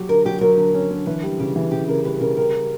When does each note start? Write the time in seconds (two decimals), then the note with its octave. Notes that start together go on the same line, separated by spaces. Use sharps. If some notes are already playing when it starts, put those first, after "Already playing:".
Already playing: F#3 G4
0.09 D3 A#4
0.25 F#3 G4
0.41 F#3 A#4
0.57 D3
0.74 C#4
0.91 D3
1.06 E3 B4
1.23 G3
1.40 C#3 G4
1.56 E3
1.72 C#3 G4
1.88 C#3 A#4
2.04 G3 B4
2.21 C#3 A#4
2.37 G3 A#4
2.54 G3